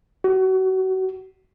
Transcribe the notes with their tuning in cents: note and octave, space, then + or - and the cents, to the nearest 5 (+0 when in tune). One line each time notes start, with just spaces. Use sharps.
F#4 +30